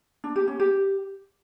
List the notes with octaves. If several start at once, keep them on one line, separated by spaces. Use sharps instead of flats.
D4
G4
C#4
G4